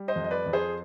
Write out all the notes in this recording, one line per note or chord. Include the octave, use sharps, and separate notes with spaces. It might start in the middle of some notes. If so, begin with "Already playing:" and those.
Already playing: G3
C5 D#5
F2
D#5
B4 D5
F2
G#4 C5